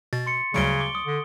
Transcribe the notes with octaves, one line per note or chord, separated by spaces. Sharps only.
B2 A6
C6 C#7
D2 C#3 F#3 G3 C#6 D7 G7
D6 G7
D#6
D3